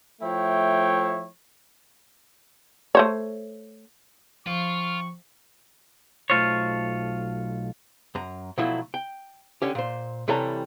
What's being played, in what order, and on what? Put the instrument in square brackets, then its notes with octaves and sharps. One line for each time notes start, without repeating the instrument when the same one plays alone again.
[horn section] F3 A3 E4 C#5 G5
[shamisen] A3 C5 C#5
[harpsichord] F3 C4 [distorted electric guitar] F4 [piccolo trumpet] C#6
[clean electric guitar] B1 A3 F4 C5 C#5
[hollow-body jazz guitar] F#2 A#5
B2 F3 F#3 A3 E4
G5
D3 C#4 G4
A#2 C5
C3 E3 G3 A4 C#5 A#5